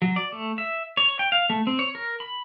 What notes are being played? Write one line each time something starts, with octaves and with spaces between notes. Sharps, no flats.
F#3
D5
A3
E5
C#5
G5
F5
A3
C4
C#5
A#4
B5